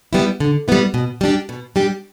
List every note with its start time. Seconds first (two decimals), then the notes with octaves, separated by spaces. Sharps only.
0.13 G3 B3 E4
0.40 D3
0.68 G3 B3 E4
0.94 B2
1.21 G3 D4 G4
1.49 B2
1.76 G3 D4 G4